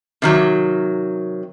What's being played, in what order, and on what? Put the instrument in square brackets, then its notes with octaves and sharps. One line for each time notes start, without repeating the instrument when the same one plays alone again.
[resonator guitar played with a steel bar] C3 D#3 F#3